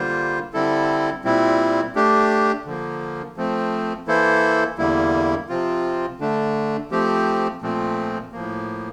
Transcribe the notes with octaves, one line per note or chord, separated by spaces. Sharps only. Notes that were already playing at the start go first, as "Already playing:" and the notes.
Already playing: D3 G3 A#3 F4 C5
D3 G3 C4 E4 A4
A#2 G3 C4 E4
A3 D4 G4
D3 F3 A#3
F3 A3 C4
E3 A#3 E4 A4 C5
E2 D3 G3 A#3 E4
C3 F3 C4 F4
D3 A3 D4
F3 A3 C4 G4
A#2 F3 A3 C4
A2 F3 A#3